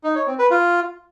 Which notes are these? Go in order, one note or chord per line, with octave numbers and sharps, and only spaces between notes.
D#4
C#5
C4
B4
F4